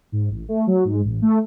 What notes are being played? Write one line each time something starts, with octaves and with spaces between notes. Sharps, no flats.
G#2
A1
A3
F#3
G#2
A1
A3